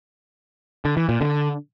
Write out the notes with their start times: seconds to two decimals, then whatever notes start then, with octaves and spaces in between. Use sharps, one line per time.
0.85 D3
0.97 E3
1.09 A#2
1.21 D3